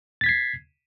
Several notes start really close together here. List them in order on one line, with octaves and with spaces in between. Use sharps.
A6 B6 G#6 C7